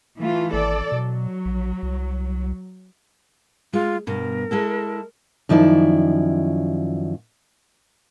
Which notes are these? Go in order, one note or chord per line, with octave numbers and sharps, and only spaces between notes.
E3 A3 F4
G#1 A4 D5
B2 F#3
A#1
C2
G#3 F4
G2 B2 A#4
G#3 E4 A4
F#2 D#3 F3 E4 D5